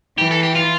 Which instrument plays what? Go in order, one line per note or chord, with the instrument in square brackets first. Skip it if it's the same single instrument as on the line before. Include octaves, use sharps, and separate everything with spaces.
[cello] E3 [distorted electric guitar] G4
[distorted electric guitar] A4
G4
F4